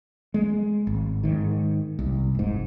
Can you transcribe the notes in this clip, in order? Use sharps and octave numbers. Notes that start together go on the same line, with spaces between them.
G#3
G#1
G#2 D#3
C2
F1 G#2